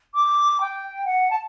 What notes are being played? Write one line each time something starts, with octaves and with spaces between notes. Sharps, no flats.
D6
G5
F#5
A5